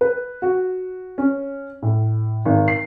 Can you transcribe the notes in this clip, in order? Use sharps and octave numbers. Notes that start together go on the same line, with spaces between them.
B4
F#4
C#4
A2
G#1
C7